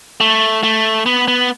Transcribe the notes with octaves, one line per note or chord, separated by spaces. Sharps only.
A3
A3
B3
B3